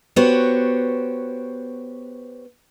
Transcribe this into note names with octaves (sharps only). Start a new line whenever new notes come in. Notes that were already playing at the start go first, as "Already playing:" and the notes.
B3 F#4 G4 C5 C#5